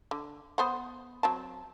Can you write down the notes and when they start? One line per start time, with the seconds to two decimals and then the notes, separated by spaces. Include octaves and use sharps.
0.11 D3
0.58 B3 C5 F#5
1.23 F#3 C4 A5